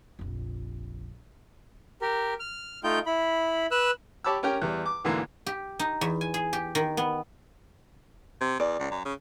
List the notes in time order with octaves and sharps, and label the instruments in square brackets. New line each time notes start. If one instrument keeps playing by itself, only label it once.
[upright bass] F1 A#1
[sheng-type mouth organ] G4 A#4
F6
A3 D#4 F4 G5 G6
E4 B5
B4 E6 F#6
[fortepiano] G4 C#5 A5 B5 D6 E6
C#4 G4 A#4 G5 A#5
E2 G3
D6
D2 G#2 D3 E3 A#3
[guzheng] G4
D#4
E2
G#5
G#4
G4
D#3
B3
[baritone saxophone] C3
[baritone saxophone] E2 [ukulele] D5
[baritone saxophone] C#2
F#2
C#3